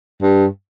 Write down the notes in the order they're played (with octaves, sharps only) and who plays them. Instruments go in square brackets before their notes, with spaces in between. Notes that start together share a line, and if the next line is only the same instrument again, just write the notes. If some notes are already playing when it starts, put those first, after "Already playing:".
[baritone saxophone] G2